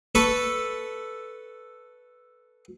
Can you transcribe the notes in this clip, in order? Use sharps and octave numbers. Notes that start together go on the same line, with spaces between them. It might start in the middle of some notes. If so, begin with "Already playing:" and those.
A4 B4 B5 C#6